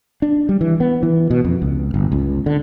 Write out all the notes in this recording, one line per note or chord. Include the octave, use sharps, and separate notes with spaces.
D4
G3
E3
B3
E3
B2
F2
C#2
G1
C#2
D3